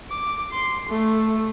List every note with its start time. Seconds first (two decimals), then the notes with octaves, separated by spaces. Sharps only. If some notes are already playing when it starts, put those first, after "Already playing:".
0.10 D6
0.52 C6
0.90 A3